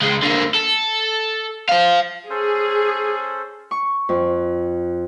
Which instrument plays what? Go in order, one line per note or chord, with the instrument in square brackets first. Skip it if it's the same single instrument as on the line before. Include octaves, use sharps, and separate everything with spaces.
[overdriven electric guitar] C#2 G#3
D3 A#3
A4
C5 F5
[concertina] C#4 A4 C5 [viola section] G#4
[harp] C#6
F2